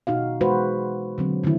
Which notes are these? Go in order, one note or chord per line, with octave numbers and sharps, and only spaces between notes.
B2 D#4 F#4 F5
E3 G#3 F#4 B4 C5
D3 F#3 C4
D3 D#3 A3 E4